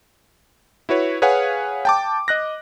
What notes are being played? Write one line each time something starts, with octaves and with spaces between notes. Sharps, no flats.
E4 F#4 B4 C#5
G#4 B4 C#5 F5 F#5 G#5
G5 A5 D6
D#5 F#6 A#6